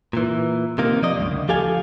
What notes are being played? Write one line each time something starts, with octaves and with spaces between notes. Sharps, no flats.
A#2 E3
C3 D#3 A#3
F3 D5 D#5
C#2 G2
D2
F3 G4 A4 F5 G#5